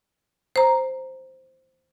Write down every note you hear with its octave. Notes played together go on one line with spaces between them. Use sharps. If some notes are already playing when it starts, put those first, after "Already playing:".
C5 A#5